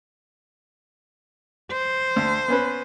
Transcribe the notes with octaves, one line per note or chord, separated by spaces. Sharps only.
C5
D2
B3 C#4 B4